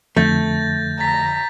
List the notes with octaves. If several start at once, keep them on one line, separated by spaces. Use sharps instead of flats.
F2 D3 A3 G6 A6 A#6
A#5 A6 B6